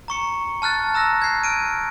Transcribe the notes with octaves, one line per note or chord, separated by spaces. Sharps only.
A#5 C#6 C#7
A5 F6 F#6 A6
A#5 E6 F#6 A#6
G#6 C7
F6 D7 D#7